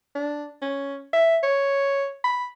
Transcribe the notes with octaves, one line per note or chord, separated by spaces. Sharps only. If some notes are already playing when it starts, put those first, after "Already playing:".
D4
C#4
E5
C#5
B5